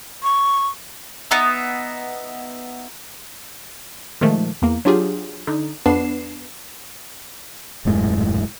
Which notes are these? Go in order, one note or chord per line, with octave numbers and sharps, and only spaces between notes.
C#6
B3 D#4 E5
A#2 D#3 F3 G#3 A3
E2 A#3
F#3 D4 F4 G4 G#4
D3 D#4
F2 B3 D4 B4 C7 E7
D#1 F#2 A2 G#3